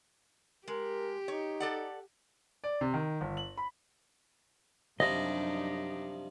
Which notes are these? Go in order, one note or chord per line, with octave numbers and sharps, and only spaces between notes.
G#3 G4 A#4
D#4 C#5
A4 D5 F#5
D5
C3
D#3
G1
F#7
B5
F#2 C3 F3 G3 D4 D#4 D#5